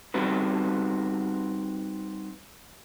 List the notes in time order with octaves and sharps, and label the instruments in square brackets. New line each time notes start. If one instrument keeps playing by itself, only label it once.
[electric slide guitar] G3 C4 D#4 F#4 B4